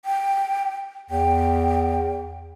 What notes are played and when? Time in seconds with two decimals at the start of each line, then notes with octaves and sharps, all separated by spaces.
0.05 G5
1.10 E2 G5